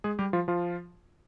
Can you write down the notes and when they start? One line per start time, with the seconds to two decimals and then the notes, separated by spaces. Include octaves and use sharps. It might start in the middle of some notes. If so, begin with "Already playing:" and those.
0.04 G#3 G#4
0.19 G3 G4
0.33 F3 F4
0.48 F3 F4